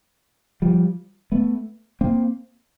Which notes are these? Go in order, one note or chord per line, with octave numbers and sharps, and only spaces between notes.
F3 G3
A3 B3
A#3 C4